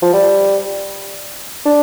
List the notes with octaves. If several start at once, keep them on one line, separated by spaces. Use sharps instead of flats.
F3
G3
D4